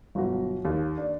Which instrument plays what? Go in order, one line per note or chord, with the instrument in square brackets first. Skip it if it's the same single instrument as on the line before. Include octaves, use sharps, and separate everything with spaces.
[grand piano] G1 B2 F#3 F#4
D#2
D4